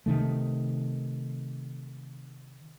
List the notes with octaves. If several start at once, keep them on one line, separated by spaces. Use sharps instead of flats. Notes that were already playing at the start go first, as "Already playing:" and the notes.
C3 D#3 A3